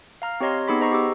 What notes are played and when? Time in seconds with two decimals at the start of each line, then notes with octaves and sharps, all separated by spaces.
0.22 F5 A#5 F6
0.41 C4 G4 C#5 D#5 A#5 C6
0.68 B3 D#4 G#4 B5 D6 B6
0.80 G#4 C5 D#5 A#5 C#6 C7
0.92 G4 D6 E6